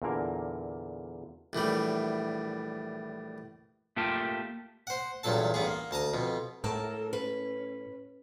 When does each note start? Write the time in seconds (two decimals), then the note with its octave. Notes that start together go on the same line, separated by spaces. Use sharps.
0.02 E2 A#2 D3 A#3 A#4
1.53 A#1 A2 E3 G3
3.96 A3 A#3 F4 G4 A#4 A5
4.87 C5 F#5
5.23 E2 G2 A#2 F#3 A4 A5
5.54 A1 G2 B3 G#4
5.67 A#3
5.91 D2 A5 A#5 D#6
6.13 F2 B2
6.64 A2 A#3 A4 A#4 A5
7.13 C#4 B4